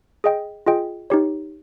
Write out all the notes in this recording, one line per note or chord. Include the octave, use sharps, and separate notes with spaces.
G#4 D#5 G5
F4 G#4 D#5 G5
D#4 G4 C#5